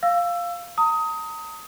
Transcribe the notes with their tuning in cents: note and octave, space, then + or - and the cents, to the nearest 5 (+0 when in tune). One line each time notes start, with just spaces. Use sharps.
F5 +0 E6 +15
A#5 -35 D#6 +20